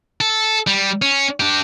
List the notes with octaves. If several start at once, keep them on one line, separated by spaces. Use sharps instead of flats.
A4
G3
C#4
D4 G4